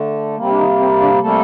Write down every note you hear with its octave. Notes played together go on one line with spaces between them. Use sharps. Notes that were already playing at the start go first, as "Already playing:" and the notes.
Already playing: D3 A3
C3 G3 A#3 C4
D4
D#3 D#4
C4
D3 D4
C3 G3 A3 A#3 A4